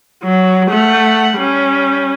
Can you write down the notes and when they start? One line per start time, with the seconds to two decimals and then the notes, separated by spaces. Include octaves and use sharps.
0.23 F#3
0.69 A3 F#5
1.37 G3 C#4